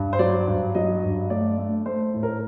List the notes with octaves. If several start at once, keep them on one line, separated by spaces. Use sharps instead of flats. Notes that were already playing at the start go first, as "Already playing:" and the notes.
Already playing: G2
C5
F#3 D5
G2
F#3 D#5
G2
A3 D5
A3
A3 C5
A2
A#4